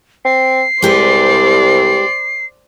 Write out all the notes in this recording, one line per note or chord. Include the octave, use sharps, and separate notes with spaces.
C4 C7
C2 G#3 G4 B4 C5 D5